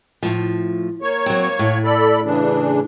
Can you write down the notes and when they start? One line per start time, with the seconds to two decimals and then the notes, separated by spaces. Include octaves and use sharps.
0.23 A2 F3
1.02 A#3 C#5 C#6
1.26 F#3 C4
1.59 A2
1.85 A4 D5 B5
2.25 C#3 E3 D4